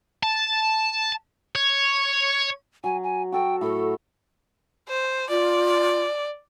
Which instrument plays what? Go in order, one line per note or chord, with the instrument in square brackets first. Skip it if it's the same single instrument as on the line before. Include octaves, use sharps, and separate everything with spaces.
[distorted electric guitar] A5
C#5
[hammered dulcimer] F#3 [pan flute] G#5
[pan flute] G#5
[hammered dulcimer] F#4 A4 [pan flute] G5
[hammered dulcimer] A2 [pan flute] A4
[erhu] C5
[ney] F4 [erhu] D5